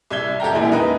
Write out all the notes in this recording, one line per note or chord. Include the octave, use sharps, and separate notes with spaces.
C2 E5 G#6 G7
G4 A4 G5 A#5
E1 A#1 A#2 E4 G#5
D#4 B4